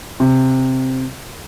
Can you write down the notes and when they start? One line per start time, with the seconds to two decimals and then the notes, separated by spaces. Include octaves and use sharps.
0.20 C3